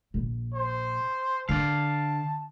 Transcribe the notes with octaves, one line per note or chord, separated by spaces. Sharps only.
A#1
C5
D3 D5 F5 A5